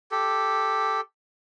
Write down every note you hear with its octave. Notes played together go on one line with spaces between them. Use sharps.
G4 A4